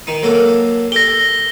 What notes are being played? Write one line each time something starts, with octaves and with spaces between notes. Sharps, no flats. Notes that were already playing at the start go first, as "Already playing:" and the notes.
D#3 D#4
F#3 A#3 A4
G4 A4 A#6 G7